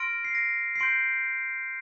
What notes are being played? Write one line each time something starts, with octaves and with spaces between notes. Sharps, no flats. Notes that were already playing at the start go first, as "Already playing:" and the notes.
Already playing: C6 F6 A#6 D7
C7
A#6 D7
C7
C6 G6 A#6 D7